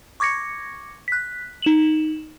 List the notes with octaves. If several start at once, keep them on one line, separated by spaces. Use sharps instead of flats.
C#6 D6 G#6 A#6 C#7
F#6 B6
D#4 E7 F#7